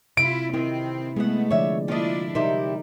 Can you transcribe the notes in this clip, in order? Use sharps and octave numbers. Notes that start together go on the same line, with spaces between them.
C3 E4 F4 D7
D#3 C4 E4
G#3 A3 B3 G#4 F#5
D3 F3 C#5 D5 E5
A#3 D4 E4 F4 D#5
C3 G3 D#4 E4 G4 A#4